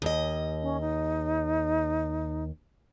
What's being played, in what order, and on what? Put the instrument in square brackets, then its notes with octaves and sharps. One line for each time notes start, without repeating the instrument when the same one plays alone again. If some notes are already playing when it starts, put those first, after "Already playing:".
[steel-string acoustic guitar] D#2 D#5
[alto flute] C#4
D#4